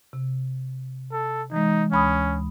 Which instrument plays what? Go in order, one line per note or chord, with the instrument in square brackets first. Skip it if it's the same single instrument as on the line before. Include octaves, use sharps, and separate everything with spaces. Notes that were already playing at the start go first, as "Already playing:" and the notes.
[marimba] C3
[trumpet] A4
[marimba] E3 G#3 [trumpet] D#4
[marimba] D2 B5 D#6 [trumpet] C#4